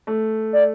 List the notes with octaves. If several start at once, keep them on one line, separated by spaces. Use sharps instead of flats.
A3
D5